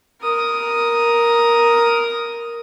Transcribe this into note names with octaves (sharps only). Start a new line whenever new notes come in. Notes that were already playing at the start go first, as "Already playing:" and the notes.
A#4 D#6